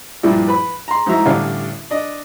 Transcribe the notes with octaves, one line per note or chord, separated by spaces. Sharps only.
G2 A#2 F3 D4 E4
B4 B5
A#5 C6
G#2 E3 F#3 E5 A#5
A1 D3 G3 C#5 F5
D4 D#5